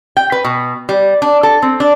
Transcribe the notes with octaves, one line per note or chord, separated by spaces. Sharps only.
G5
B4
B2
G3
D4
A4
C4
D4